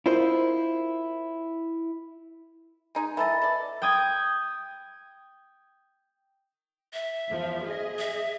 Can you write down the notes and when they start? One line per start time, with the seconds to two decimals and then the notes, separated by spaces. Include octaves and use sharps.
0.06 E4 F4 A#4 C5 D#5
2.95 G#3 D#4 G#4
3.17 E3 A4 D#5 E5 B5 A6
3.42 A4 D5
3.82 G5 D#6 G#6
6.93 E5
7.28 E2 F3
7.64 G#4 D#5
7.99 E5